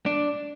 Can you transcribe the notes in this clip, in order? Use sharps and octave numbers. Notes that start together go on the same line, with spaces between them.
D4